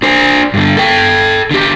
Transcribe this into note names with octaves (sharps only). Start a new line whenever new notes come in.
D4 C5
G2 D3
A4 G5
D3 G4